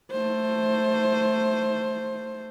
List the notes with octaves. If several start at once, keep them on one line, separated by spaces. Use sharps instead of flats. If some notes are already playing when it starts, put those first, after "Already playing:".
A3 C5